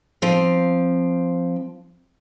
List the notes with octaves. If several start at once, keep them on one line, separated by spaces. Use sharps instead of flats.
F3 C4 F5